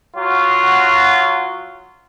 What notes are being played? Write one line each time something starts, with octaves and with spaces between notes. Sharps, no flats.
F#3 F4 F#4